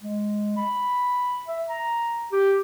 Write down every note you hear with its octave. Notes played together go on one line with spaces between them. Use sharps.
G#3
B5
E5
A#5
G4